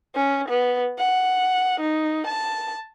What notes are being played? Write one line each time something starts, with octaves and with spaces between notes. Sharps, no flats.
C#4
B3
F#5
D#4
A5